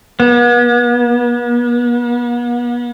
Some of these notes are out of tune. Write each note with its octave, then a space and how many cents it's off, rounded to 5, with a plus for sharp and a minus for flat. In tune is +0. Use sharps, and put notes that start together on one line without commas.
B3 -40